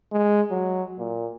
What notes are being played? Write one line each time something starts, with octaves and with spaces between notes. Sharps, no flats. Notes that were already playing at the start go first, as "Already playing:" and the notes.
G#3
F#3
A#2